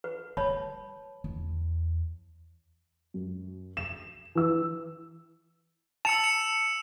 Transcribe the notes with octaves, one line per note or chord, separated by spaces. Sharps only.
B4
G3 C#5 A5 B5
E2
F#2
E7
E3 E6
A5 E6 C#7 F7
C#7 E7